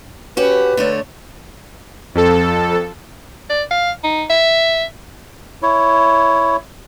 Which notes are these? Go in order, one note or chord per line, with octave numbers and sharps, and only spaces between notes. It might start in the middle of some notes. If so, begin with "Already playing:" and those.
C#4 F#4 G4 B4
D3 A3 C#5
F2 A4
D5
F5
D#4
E5
E4 C#5